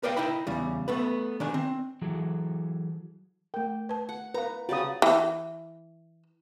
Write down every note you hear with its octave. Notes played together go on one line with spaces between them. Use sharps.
A#4 B4 D5 D#5 F5 G5
D#4 E4 D#5 G5 B5
E2 C#3 G3
A3 B3 B4
D#3 D4 G#5
C4
E3 F#3 G#4 A4
A3 A#4 G5
B4 A5
F#5
A#4 B4 F5 A#5
C#3 G3 F#4 D5 D#6
E3